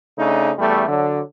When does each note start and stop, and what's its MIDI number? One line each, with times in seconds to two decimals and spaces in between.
0.18 0.51 49
0.18 0.51 57
0.18 0.51 62
0.18 0.51 63
0.59 0.85 40
0.59 0.85 55
0.59 0.85 57
0.88 1.20 50
0.88 1.20 54